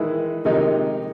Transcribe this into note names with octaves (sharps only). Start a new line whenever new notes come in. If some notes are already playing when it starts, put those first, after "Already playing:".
Already playing: D#3 E3 G#3 E4
C3 D#3 F3 G#3 D#4